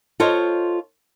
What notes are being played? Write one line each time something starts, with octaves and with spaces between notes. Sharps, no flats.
F4 A4 C5 C#5 D#5